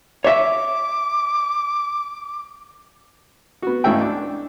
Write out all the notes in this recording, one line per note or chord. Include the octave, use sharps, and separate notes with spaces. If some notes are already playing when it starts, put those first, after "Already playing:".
C#5 E5 D6
B3 F#4
G#1 C#2 A2 C#4 E5 G5
D4